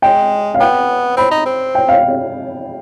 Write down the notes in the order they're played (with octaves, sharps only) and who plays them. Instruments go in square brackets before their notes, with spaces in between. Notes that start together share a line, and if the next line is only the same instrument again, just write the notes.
[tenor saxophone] G#3 [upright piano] G5
[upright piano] F5
[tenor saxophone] B3 [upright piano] G5
[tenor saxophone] C4 [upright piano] B5
[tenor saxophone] D#4
C4
[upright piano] G5
F5